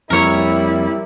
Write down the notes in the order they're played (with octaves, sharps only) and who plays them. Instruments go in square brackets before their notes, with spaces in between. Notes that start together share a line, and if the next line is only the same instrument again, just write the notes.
[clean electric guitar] F2 A#3 [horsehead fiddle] G3 E4 [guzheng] A#4 C#5